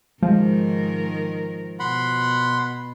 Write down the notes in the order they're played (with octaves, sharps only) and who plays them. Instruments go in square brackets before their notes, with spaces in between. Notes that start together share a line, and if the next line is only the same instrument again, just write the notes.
[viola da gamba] G#2 D#3 A#4 [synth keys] F3 [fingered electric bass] G#3
[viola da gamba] B2 [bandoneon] F#5 B5 C6